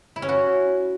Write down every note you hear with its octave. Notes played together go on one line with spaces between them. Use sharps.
E4
C#4
F#4